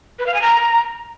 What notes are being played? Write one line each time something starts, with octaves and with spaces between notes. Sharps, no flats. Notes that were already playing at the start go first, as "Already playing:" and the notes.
B4
F5
G#5
A#5